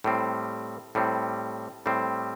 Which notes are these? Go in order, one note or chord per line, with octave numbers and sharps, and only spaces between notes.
A2 G3 C4
A2 G3 C4
A2 G3 C4